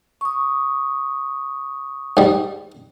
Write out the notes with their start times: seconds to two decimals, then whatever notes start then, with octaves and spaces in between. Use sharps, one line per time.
0.21 C#6 D#6
2.17 G#2 G3